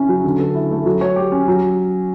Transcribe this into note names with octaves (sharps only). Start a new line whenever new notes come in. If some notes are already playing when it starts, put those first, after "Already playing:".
Already playing: C#3 C#4 E4
F#3
D3
A4
E4
A3
F#3
C#5
G4
C#4
F#3